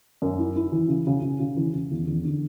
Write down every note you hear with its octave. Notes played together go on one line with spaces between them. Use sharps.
F#2
E4
E4
E3
C#3
C#3
C#3
C#3
E3
C#3
E2
E2
D3